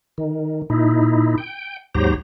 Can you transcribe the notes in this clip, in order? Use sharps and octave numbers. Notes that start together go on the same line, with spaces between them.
D#3
A#2 D#4 E4
G5
D#2 G#2 F#3 G4 C5 A#5